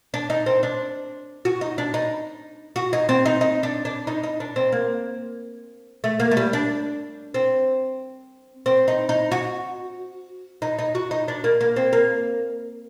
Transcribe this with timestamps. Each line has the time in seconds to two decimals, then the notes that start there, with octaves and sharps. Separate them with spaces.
0.14 D4
0.30 D#4
0.46 C4
0.63 D4
1.45 F#4
1.61 D#4
1.78 D4
1.94 D#4
2.76 F#4
2.93 D#4
3.09 C4
3.26 D#4
3.41 D#4
3.63 D4
3.85 D4
4.07 D#4
4.23 D#4
4.40 D4
4.56 C4
4.72 A#3
6.04 A3
6.20 A#3
6.31 A3
6.37 G3
6.53 D4
7.34 C4
8.66 C4
8.88 D#4
9.09 D#4
9.32 F#4
10.62 D#4
10.79 D#4
10.95 F#4
11.11 D#4
11.28 D4
11.44 A#3
11.61 A#3
11.76 C4
11.93 A#3